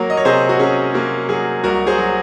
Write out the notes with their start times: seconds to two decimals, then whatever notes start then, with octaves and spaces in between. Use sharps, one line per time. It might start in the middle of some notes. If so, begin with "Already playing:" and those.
Already playing: F#3 A#3 A#4 C#5
0.10 D#5
0.17 C#5
0.25 C3 G#4 C5
0.49 F#4
0.59 C#4 G#4
0.94 A#3 F#4
1.29 F#3 G#4
1.64 C2 F#4 A#4
1.87 G#4 C5
1.98 F#3